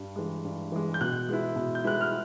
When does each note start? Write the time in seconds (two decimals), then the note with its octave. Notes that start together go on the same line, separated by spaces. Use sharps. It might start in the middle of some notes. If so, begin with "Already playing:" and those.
Already playing: G2
0.16 E3 G#3
0.44 G2
0.72 E3 G#3
0.94 G6
1.01 B2 F#6
1.29 G#3 B3 E4
1.56 B2
1.75 G6
1.84 G#3 B3 E4 F#6
2.01 F6